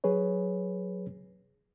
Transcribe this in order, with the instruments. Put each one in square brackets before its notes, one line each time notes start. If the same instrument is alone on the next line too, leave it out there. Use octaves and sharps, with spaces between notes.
[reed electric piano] F#3 G#4 B4 C#5